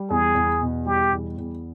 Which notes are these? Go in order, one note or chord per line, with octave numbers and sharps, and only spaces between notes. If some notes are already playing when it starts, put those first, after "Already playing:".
Already playing: G3
E2 G#4
E2
B2
G3 G4
E2
E2